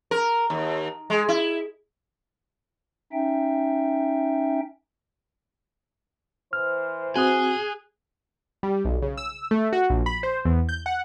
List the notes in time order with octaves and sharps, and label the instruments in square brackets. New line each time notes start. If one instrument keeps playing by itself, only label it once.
[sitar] A#4
D#2
G#3
E4
[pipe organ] C#4 D#4 E5 G5
[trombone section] E3 C5 [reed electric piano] F6
[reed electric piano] C4 F#4 [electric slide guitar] G#4 [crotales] D#6 F#6 G7
[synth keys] G3
B1
C#3
E6
A3
F#4
A#1
B5
C5
E2
G6
F#5